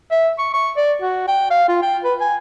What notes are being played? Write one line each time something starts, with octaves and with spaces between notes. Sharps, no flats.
E5
C#6
C#6
D5
F#4
G5
F5
F4
G5
B4
G#5